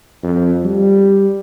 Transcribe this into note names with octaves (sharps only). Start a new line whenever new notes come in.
F2
G3